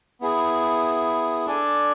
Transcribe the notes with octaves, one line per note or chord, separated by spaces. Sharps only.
B3 E4 G#4
D4 A4 D5 G#5